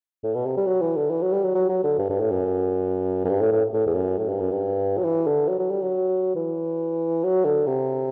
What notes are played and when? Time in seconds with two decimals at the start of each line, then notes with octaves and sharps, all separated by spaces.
0.23 A2
0.34 B2
0.46 C3
0.57 G3
0.66 F#3
0.81 E3
0.97 D3
1.10 E3
1.22 F#3
1.32 G3
1.44 F#3
1.55 F#3
1.69 F#3
1.83 D3
1.98 G2
2.09 G2
2.20 A2
2.31 F#2
3.25 F#2
3.29 G2
3.41 A2
3.52 A2
3.73 A2
3.86 E2
3.95 F#2
4.18 A2
4.28 G2
4.40 F#2
4.51 G2
4.98 F#3
5.04 E3
5.27 D3
5.48 F#3
5.59 F#3
5.70 G3
5.81 F#3
6.35 E3
7.24 F#3
7.45 D3
7.66 C3